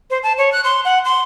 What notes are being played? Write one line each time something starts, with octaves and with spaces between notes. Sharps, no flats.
C5
A5
C#5
F#6
C6
F#5
C6